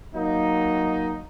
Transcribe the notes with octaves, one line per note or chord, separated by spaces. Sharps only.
F#3 A#3 D#4